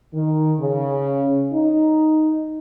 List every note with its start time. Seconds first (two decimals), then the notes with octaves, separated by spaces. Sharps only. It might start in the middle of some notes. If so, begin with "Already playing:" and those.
0.14 D#3
0.60 C#3
1.53 D#4